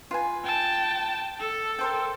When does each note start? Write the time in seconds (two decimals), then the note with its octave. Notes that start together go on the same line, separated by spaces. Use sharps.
0.11 F4 B4 G#5
0.44 G5 A5
1.39 A4
1.79 A#4 C5 G5